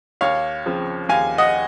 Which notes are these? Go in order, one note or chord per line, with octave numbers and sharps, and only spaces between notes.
D#2 C#5 F5
C#3 F3 C4
D#2 F5 G#5
D#5 F#5